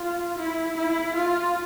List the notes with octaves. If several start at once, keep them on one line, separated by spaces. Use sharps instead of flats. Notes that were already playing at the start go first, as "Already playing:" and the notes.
Already playing: F4
E4
E4
F4